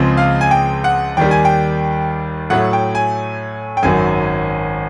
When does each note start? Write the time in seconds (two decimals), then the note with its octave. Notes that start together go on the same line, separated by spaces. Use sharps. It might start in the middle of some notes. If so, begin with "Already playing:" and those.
Already playing: C#2 C#3 F3 G#3 C4
0.17 F5
0.41 G#5
0.51 G5
0.84 F#5
1.17 D#2 D#3 G3 G5
1.31 G#5
1.45 G5
2.50 A2 F#3 A3 F#5
2.73 G5
2.95 G#5
3.77 G5
3.83 G#1 F#2 D#3 F#3 G#5